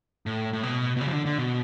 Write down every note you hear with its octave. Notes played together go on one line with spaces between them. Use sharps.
A2
A2
B2
B2
C#3
F3
D3
D3
B2